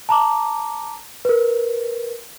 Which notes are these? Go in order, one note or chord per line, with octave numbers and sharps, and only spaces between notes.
A5 A#5 D6
A#4 B4